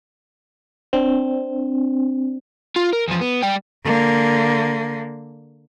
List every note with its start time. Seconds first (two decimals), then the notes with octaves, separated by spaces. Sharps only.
0.93 C4 D4
2.76 F4
2.93 A#4
3.08 E2 F3
3.21 B3
3.43 G3 G5
3.85 D3 A#3